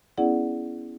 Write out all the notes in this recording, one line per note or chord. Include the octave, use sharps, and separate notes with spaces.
B3 C#4 E4 G#4 D5 F#5